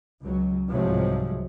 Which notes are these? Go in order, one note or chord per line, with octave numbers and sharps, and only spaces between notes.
C#2 F#3
C2 G#2 C3 F3 F#3 G#3